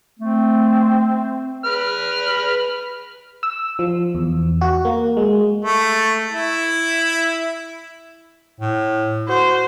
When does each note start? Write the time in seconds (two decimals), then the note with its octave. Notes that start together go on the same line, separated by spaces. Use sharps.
0.19 A3 C4
1.65 B4 F6
3.43 E6
3.79 F3
4.15 E2
4.61 F#4
4.85 A#3
5.17 G#3
5.63 A3
6.32 E4
8.60 A2
9.28 F#4 C5